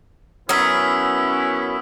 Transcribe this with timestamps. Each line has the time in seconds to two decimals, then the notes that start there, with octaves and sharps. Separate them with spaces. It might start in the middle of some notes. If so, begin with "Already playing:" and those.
0.49 F#3 B3 C#4 E4 A#4 D#6 E6 B6